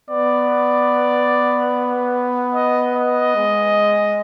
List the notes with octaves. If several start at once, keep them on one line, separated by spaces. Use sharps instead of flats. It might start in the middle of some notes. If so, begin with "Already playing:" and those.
B3 D5
D#5
D#5
G#3